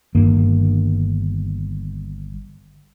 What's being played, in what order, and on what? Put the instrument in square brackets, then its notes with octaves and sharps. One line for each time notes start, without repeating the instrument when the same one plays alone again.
[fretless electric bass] G1 G2 D#3 A#3